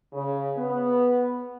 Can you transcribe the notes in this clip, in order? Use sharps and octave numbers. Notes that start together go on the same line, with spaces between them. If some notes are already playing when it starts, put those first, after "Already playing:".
C#3
B3